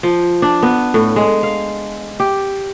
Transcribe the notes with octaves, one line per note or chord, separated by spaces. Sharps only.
F3
D4
B3
A2
G#3
F5
G4